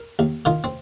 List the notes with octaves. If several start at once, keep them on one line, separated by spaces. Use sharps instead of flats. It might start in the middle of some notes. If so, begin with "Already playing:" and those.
Already playing: A#4
D#2
D#3 F4 A#4
C4